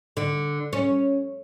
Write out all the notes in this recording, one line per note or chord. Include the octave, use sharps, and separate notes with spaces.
D3
C#4